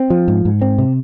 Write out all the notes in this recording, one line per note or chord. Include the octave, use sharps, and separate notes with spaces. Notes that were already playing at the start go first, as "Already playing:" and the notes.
Already playing: C4
F3
G#2
G#2
C4
C3